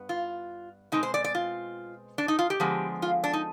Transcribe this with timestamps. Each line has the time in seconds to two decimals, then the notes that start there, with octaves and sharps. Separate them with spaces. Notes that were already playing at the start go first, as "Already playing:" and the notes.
Already playing: G2 B3
0.09 F4
0.92 B2 G#3 C4 D#4
1.03 C5
1.14 D5
1.24 D5
1.35 F4
2.18 D4
2.28 D#4
2.39 F4
2.50 G4
2.60 D3 F3 G#3 B3
3.02 F4
3.24 D4
3.33 D#4